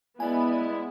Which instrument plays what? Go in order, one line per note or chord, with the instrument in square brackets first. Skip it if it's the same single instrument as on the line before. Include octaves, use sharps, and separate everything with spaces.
[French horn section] G#3 E4 [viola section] B3 [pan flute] D5 [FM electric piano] G#5